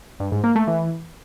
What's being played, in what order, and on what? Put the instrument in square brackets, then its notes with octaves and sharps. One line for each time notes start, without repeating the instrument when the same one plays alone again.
[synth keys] G2
G#2
A#3
A3
E3